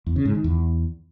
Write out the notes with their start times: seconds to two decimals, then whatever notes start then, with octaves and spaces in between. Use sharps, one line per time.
0.07 E2
0.16 C#3
0.25 G#2
0.35 D#3
0.44 E2